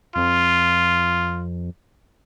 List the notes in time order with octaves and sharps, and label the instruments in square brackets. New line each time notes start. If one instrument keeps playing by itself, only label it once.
[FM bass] F2 [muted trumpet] F4